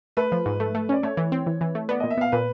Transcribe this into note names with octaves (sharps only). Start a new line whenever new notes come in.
A3 B4
F3
G#2
A3
A3
C#4 D5
A3 C#5
E3
C4
E3
E3
A3
B3 D5
A#2 D#5
E5
B3 F5
A#2 B4